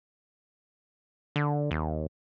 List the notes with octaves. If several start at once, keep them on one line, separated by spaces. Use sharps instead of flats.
D3
D#2